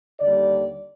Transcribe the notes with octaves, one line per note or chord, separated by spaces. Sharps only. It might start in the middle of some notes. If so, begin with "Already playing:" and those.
D#2 D3 G3 D5